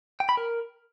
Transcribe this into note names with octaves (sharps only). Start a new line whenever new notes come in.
G5
B5
A#4